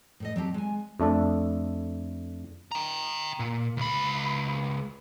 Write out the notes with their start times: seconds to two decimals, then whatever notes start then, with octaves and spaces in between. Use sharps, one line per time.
0.20 A2 A4 D#5
0.36 F#3 C4 G4 A5
0.54 G#3 G#5
1.00 F2 A3 D4 A4
2.72 G5 A#5
3.39 A#2
3.77 C#2 B5